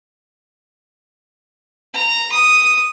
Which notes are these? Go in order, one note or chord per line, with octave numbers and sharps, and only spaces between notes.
A#5
D#6